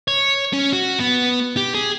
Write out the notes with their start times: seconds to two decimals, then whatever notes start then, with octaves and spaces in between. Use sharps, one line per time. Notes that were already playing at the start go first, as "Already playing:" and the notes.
0.08 C#5
0.53 C#4
0.73 F#4
0.99 B3
1.57 G4
1.74 G#4